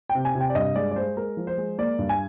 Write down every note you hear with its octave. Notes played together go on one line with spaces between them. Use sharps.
C3 G5
G#5
C3
G5
D5
G2 D#5
G#3 D5
D5
G#3 C5
G#3 A#4
F3
C5
G#3
A#3 D5
G2
G#5